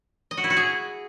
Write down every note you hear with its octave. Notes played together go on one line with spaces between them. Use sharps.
D#5
F#4
E4
F#4
G#4